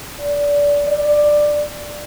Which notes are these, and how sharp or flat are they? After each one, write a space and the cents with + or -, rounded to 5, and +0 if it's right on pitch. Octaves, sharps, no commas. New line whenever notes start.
D5 -20
D5 +10